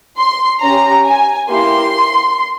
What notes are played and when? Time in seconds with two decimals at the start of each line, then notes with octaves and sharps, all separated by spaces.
0.18 C6
0.61 C#4 G4 A#5
1.05 G#5
1.49 A#3 E4 G4 C6